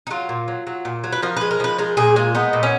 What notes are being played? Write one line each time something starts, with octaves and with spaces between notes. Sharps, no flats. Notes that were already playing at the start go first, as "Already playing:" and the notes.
D#4
F#3 F4
A#2
F#3
F#3
A#2
F#3
B4
F3 A#4
G#3 B4
A#4
F3 B4
G#3 A#4
A#2 G#4
G#3 F4
B3 D#4
A#2
C#4